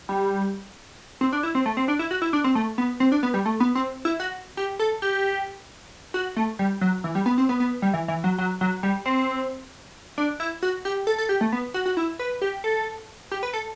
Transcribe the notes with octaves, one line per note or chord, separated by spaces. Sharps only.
G3
C4
D4
E4
C4
A3
C4
D4
E4
F#4
E4
D4
C4
A3
B3
C4
D4
B3
G3
A3
B3
C4
E4
F#4
G4
A4
G4
F#4
A3
G3
F#3
E3
G3
B3
C4
B3
B3
G3
E3
E3
F#3
F#3
F#3
G3
C4
D4
E4
F#4
G4
A4
A4
G4
A3
B3
F#4
F#4
E4
B4
G4
A4
G4
B4
A4